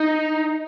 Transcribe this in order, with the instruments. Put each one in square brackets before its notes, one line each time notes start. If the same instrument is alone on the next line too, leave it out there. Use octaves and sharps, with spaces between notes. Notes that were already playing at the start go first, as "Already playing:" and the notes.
Already playing: [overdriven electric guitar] D#4